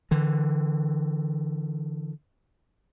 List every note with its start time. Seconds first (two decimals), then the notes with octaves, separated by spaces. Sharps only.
0.11 D3 E3